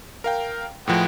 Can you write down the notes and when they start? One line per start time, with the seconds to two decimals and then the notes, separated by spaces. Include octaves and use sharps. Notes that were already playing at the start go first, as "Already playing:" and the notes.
0.24 A#4 F5 G5
0.88 A2 F3 G#3 B3 G5